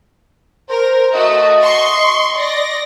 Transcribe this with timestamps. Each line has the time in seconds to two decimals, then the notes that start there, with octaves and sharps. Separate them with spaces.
0.69 A#4 C5
1.13 A3 F#4 D#5
1.62 C6 C#6
2.36 D5 A#6